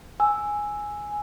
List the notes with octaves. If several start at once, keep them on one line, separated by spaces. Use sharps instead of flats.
G#5 E6